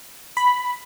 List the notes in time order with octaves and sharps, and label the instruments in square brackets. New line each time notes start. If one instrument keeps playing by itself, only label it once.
[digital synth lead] B5